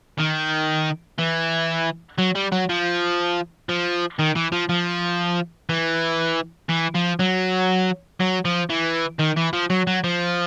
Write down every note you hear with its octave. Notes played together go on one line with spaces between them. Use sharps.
D#3
E3
F#3
G3
F#3
F3
F3
D#3
E3
F3
F3
E3
E3
F3
F#3
F#3
F3
E3
D#3
E3
F3
F#3
F#3
F3